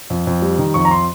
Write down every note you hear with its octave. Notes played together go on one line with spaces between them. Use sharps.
F2
F2
G3
D#3
F2 C#6
A#5
C6